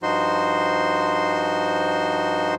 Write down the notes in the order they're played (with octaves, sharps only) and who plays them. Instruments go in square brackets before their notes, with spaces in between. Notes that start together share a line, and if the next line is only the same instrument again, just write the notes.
[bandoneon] G2 F3 D#4 F#4 C5 C6